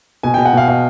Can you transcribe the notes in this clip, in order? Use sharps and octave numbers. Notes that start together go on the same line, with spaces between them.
B2 G#5
B2 G5
F#5
B2 F5
B2 F5